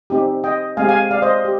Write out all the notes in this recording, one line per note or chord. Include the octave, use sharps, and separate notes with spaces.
C4 D#4 G4
D#5 G5
G#3 C4 G4 F5 G#5
F5 G#5
D5 F5
C5 D#5
G4